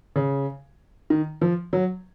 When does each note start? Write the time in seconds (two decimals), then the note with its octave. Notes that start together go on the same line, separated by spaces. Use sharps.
0.16 C#3
1.10 D#3
1.42 F3
1.73 F#3